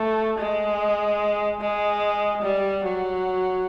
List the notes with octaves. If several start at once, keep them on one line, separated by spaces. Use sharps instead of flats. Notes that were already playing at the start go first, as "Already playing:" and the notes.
Already playing: A3
G#3
G#3
G3
F#3